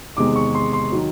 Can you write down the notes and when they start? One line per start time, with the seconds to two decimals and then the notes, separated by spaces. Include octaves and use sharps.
0.17 E2 C3 D#3 G#3 D6
0.36 C#6
0.55 C6
0.73 C6
0.92 D#3 F#3